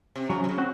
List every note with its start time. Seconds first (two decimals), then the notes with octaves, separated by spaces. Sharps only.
0.16 C3
0.30 C#3 F#3
0.44 C3
0.49 C#3
0.58 C4 F#4